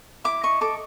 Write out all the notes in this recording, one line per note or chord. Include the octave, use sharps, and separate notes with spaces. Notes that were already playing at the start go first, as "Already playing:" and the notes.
E4 D6
D#5 C#6
A4 D6